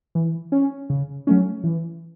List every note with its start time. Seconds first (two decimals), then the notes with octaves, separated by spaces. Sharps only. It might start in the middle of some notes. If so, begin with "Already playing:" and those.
0.15 E3
0.52 C#4
0.90 C#3
1.27 F#3 A3 C#4
1.64 E3